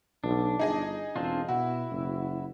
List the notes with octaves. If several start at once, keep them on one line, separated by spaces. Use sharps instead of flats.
B1 D4
G1 D#4 G#4 D#5
E1 C4 D4 F4
B2 E4 F#4
F#1